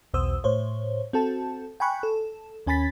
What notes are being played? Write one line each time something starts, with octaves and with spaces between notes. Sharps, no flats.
B1 E2 B2 C5 D#6 E6
A2 C5 C#5
C4 F#4 A4 A5
G5 G#5 B5 C#6 F#6
A4
D#2 C#4 G#5 B5 A6 B6